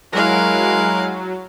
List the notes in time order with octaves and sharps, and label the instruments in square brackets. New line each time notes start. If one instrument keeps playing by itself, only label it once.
[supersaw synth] F#3 [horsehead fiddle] G#3 E4 [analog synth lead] A#4 [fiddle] F5 F#6